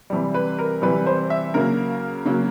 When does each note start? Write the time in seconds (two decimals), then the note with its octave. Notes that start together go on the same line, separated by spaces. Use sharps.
0.10 C3 E3 G3
0.34 B4
0.59 A#4
0.82 C3 E3 G3 B4
1.06 C5
1.30 E5
1.54 C#3 F#3 A#3 A#4
2.25 C#3 F#3 A#3